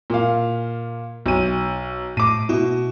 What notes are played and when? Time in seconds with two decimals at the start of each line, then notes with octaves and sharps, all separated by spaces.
0.10 A#2 F5
1.26 B1 D#7
2.17 A2 D6 D#7
2.49 B2 E4